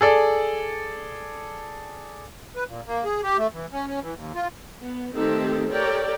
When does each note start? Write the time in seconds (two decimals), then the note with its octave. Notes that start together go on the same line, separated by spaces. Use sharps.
0.01 G#4 A4 D5
2.56 B4
2.68 A#2
2.86 A#3
3.05 G#4
3.23 G4
3.38 A3
3.53 E3
3.72 C#4
3.87 C#4
4.01 E3
4.15 D#2
4.35 F4
4.82 B3
5.15 D#3 A3 C4 D#4 G4 A4
5.69 G4 A4 A#4 C#5 D5 G5